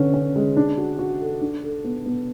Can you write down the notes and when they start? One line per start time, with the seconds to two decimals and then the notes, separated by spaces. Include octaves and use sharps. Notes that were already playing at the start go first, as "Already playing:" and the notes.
Already playing: D3 C#4 B4
0.14 C#4
0.36 G#3
0.57 D4
0.78 F#4
0.99 F#4
1.21 A4
1.41 D4
1.64 A4
1.84 B3
2.06 B3